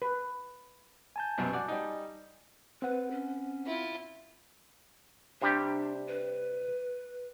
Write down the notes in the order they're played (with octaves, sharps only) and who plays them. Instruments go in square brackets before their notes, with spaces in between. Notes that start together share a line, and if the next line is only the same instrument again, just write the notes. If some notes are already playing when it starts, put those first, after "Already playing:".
[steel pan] B4
[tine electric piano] G#5 A5 G6
[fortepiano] C2 F#2 B2
F#4 D5
G3 D#4
[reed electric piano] C4 F#5 [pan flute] B4
[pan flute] C#4
[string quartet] E4 F4
[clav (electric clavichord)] C3 G3 G4 [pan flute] D4
[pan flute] B4